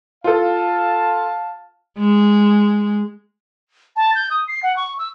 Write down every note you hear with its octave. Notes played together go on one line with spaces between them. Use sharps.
F4 A4 F5 A5
G#3
A5
G6
D#6
C7
F#5
C#6
E6